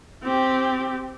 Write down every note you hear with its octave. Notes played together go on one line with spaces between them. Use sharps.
C4 G4